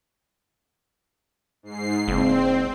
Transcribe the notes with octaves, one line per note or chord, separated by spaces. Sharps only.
G#2 C7
F#1 C4